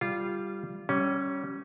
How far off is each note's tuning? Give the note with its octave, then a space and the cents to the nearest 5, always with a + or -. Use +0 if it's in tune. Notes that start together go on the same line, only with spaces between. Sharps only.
G3 +0 F4 -15
G3 -25 C#4 +0